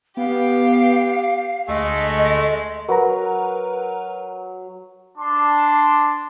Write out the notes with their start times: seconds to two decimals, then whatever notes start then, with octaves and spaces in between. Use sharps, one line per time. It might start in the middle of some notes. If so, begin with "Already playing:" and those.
0.17 B3 G4 F5
1.68 D2 G#3 A3 D#5
2.89 F#3 A#4 B4 A#5
5.18 D4 A5 C6 D6